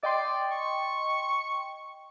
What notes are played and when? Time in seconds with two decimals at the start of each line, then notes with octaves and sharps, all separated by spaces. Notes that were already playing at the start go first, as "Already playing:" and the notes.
0.03 D5 D#5 G5 C6
0.52 C#6